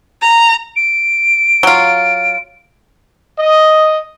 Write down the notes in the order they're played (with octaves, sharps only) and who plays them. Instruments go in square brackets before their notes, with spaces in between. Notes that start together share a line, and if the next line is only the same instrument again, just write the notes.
[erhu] A#5
[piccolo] D7
[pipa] F#3 F4
[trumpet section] D#5